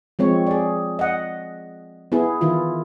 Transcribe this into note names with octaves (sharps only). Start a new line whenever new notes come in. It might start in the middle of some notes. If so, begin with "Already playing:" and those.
F3 G#3 C4 C#5
G#4 D5
D#5 F#5
B3 E4 G#4
D#3 E3 E4 F4